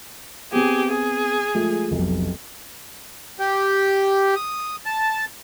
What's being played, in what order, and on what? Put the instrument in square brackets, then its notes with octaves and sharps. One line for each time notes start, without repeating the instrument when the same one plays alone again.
[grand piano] B3 C4 [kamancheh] G4 G#4
[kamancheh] G#4
[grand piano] F3 G#3 A3
F1 B1
[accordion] G4
D#6
A5